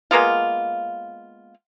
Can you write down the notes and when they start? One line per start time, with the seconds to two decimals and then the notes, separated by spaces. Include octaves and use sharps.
0.11 G#3 A#3 B3 F4